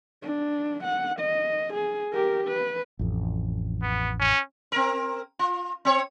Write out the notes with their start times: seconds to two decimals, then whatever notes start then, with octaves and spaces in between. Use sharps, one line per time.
0.23 D4
0.84 F#5
1.20 D#5
1.74 G#4
2.13 G4 A#4
2.48 B4
2.99 A1 F2
3.82 B3
4.20 C#4
4.72 C4 A#4
5.39 F4
5.85 C4 C#5